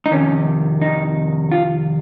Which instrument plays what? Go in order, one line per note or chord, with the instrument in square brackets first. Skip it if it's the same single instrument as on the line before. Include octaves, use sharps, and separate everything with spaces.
[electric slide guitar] D#4
F2 C3 D#3 C#4
D#4
F4